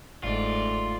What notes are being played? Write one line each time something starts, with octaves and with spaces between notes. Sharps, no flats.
G1 G#2 A3 F4 D5